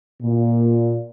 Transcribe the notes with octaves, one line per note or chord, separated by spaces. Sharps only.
A#2